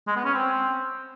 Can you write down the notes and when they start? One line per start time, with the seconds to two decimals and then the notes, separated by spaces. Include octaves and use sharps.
0.07 G#3
0.16 B3
0.25 C#4
0.34 C4